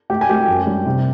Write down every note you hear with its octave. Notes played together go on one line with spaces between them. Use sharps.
A3 G4 G5
G#5
A3 G4 G5
F#2
G3
C3